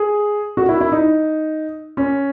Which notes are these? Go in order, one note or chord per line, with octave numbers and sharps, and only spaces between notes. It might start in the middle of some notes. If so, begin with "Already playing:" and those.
Already playing: G#4
F#4
E4
E4
D#4
C#4